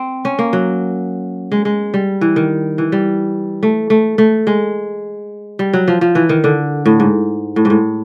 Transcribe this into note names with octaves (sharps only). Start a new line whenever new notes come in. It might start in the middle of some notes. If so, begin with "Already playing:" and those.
Already playing: C4
C#4
A#3
F#3
G#3
G#3
G3
E3
D#3
E3
G3
A3
A3
A3
G#3
G3
F#3
F3
F3
E3
D#3
D3
A2
G#2
A2
G#2
A2